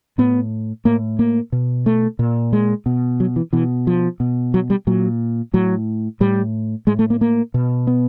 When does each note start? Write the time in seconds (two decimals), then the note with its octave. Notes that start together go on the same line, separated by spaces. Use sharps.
0.18 A2 B3
0.85 A2 A#3
1.19 A#3
1.52 B2
1.86 A3
2.19 A#2
2.53 G#3
2.86 B2
3.20 F#3
3.36 E3
3.53 B2 E3
3.87 F3
4.20 B2
4.54 F#3
4.70 G3
4.87 A#2 F#3
5.54 A2 F#3
6.20 A2 G3
6.87 A2 G#3
6.99 A3
7.10 A#3
7.21 A#3
7.54 B2
7.87 B3